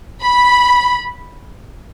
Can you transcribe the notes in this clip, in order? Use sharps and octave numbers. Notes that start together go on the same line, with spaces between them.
B5